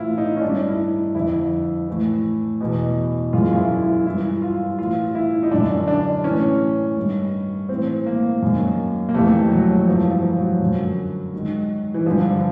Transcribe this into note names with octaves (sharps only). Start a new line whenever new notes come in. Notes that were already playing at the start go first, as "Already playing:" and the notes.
Already playing: A2 E3 E4 F4
D#4
C#4
G2 D#3 D4
E4
D#4
F2 D3 E4
A2 E3
E2 B2
F#2 C#3 E3 F4
F4
E4
E4
G2 E3 E4
F4
A2 E3 F4
E4
D#4
F#2 D3 D4
D4
A2 E3 C#4
G2 D#3
A2 E3 C4
A#3
F#2 D#3
A#3
F2 C3 E3 A3
F#3
G2 E3 F3
F3
F#3
F#2 D3
G#2 D#3
E3
G2 D3 F3